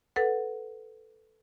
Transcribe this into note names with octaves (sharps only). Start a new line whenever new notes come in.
A4 B4 F#5